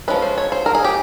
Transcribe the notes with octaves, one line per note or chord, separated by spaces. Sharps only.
F3 G#3 C#4 B4
C5
C#5
C5
A#4
G#4
G4